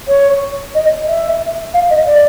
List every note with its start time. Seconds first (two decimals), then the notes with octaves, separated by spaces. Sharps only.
0.08 C#5
0.74 D#5
1.07 E5
1.73 F5
1.90 D#5
2.06 D5